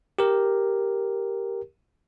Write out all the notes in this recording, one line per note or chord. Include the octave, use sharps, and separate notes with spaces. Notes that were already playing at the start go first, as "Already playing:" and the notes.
G4 A#4